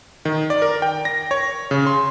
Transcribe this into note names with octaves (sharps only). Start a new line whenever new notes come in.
D#3
D5
A#4
G5
A#6
C#5
C#3
C6